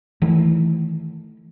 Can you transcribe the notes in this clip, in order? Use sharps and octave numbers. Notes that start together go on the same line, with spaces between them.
D#3 E3 A3